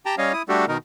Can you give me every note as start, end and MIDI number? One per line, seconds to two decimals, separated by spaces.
0.06 0.15 67
0.06 0.15 79
0.06 0.15 81
0.06 0.15 82
0.18 0.33 55
0.18 0.33 61
0.18 0.33 73
0.18 0.33 75
0.18 0.33 77
0.33 0.42 64
0.33 0.42 87
0.49 0.66 55
0.49 0.66 57
0.49 0.66 62
0.49 0.66 66
0.49 0.66 67
0.49 0.66 69
0.68 0.78 47
0.68 0.78 51
0.68 0.78 63
0.68 0.78 70